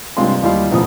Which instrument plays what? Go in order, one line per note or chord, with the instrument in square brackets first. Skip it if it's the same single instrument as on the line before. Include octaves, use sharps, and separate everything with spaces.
[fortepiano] G2 C3 G#3 F4 F5 C6
D#2 G3 E4 F4 F5 C6
B1 A2 C#3 F3 D#6